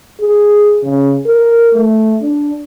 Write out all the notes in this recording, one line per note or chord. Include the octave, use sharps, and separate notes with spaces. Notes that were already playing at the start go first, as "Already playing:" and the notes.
G#4
C#3
A#4
A3
D4